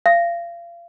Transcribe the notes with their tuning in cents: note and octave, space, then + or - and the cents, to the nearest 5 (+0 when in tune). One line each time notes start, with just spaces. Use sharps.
F5 -30